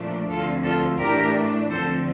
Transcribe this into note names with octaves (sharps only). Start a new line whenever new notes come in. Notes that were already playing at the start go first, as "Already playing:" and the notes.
Already playing: A#2 F3 A3 D4
D2 D3 F3 C4 F4 A4
F4 A4
A2 E3 A3 D4 G4 A#4
D2 D3 F3 C4 A4 C5